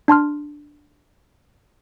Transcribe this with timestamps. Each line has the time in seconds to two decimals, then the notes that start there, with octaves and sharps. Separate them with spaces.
0.08 D4 A5 C6 F6